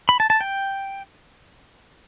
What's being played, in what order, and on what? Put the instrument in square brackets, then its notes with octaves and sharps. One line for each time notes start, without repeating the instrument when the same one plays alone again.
[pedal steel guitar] B5
A5
A5
G5